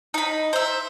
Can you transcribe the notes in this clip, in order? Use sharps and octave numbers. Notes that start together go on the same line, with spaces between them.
D#4 B5
C5 E5